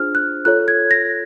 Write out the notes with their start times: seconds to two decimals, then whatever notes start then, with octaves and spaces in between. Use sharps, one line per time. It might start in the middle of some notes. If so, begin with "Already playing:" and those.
Already playing: D4 F4 G#4 C5 F6
0.15 F#6
0.45 F4 A4 C#5 F#6
0.68 G#6
0.91 A#6